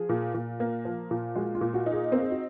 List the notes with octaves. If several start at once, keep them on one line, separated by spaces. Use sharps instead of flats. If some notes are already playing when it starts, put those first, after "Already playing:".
Already playing: F3 G#4
A#2
A#2
A#3
F3
A#2
G#3 F#4
F4
A#2
F#4
D#4
G#4
C4 A#4
G#4
F#4